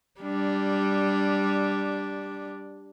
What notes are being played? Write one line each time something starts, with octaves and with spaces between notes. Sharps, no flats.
G3 D4